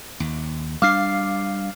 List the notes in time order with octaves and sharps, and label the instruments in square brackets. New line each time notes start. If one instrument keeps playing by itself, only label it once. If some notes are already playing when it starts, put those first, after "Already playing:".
[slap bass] D#2
[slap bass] G3 D4 [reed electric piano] F5 [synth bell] D6 F6 C7